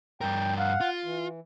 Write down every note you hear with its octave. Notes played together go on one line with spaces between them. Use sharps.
G2 A#4 G5
F5 F#5
F4
E3